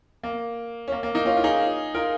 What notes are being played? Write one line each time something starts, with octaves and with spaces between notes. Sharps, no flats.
A#3
C#4
A#3
A#3
A#3 D#4
C#4 F4
F4
D#4 G#4
F4 A#4